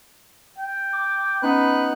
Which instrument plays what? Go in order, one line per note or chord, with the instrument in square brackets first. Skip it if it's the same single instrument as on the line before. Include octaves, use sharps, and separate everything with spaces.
[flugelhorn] G5
[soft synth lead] D6
[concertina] B3 D#4 F#6 [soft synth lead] C#4 [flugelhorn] B4